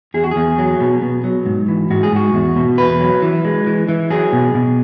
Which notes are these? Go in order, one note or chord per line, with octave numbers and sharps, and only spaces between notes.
E2 G#4
F#4
E2 G#4
F#3
B2
B2
F#3
G#2
E3
G#2 F#4
G#4
G#2 F#4
E2
B2
E2 B4
F#3
E3
G#3
E3
E3
F#3 G#4
B2
B2